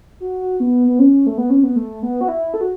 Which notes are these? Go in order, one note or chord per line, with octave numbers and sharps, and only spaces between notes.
F#4
B3
B3
C#4
A3
B3
C#4
B3
A3
B3
F#4
E4
A4
F#4